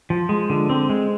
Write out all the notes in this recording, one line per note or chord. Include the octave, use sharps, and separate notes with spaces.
F3
G#3
D3
C4
G#3